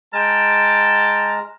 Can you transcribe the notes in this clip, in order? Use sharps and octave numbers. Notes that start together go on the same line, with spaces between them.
G#3 G5 A5 A#5 F6